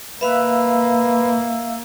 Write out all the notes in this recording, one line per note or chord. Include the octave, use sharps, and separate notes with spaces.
A#3 B4 E5 F5 E6